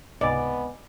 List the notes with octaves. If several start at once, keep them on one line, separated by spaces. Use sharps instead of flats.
C#2 G#2 C3 B3 D5 D#5 G#5 B5